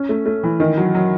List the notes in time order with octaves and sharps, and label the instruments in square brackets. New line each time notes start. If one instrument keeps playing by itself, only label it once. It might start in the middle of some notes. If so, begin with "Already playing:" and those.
Already playing: [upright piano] C#4
A3
A3
E3
D#3
F#3
F#3